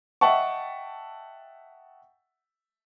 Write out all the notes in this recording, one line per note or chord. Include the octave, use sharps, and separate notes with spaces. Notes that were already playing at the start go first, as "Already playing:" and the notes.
D#5 E5 F#5 G5 A5 C#6